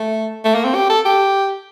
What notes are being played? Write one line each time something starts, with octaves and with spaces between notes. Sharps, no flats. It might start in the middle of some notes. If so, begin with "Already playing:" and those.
Already playing: A3
A3
A#3
C4
G4
A4
G4